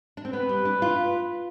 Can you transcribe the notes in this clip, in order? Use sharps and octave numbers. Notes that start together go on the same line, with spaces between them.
D4
C4
B3 B4
G3
D4
F4